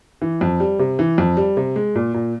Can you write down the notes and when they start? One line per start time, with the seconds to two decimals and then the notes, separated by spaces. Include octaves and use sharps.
0.22 E3
0.41 F2
0.60 G3
0.79 C3
0.99 E3
1.18 F2
1.37 G3
1.57 C3
1.76 G#3
1.95 A#2
2.14 A#2